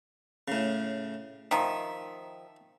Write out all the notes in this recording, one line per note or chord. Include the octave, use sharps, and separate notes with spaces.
A2 C#3
D#3 F3 E5